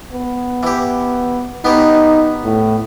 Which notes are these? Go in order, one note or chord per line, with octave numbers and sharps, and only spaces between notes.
B3
E3 G4
B3 D#4 G4
A2